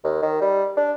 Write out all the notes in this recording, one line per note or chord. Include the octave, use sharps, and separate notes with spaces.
D#2
D#3
G3
D4